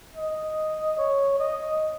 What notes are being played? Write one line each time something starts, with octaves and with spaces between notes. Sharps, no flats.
D#5
C#5
D#5